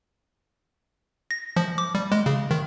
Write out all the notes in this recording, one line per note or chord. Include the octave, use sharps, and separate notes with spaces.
A#6
F3
D6
G3
G#3
C#3
D#3